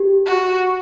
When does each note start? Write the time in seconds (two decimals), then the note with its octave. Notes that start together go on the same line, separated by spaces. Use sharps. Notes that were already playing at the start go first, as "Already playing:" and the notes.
Already playing: G4
0.26 F#4